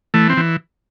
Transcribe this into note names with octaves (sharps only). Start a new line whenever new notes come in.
E3 A3
C4
E3